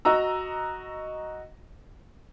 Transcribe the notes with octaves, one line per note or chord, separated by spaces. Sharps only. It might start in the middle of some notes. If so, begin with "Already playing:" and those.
F#4 D#5 A#5 E6